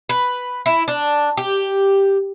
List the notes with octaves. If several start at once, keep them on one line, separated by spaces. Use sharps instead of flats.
B4
E4
D4
G4